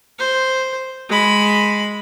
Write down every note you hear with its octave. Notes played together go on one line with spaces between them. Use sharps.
C5
G#3 B5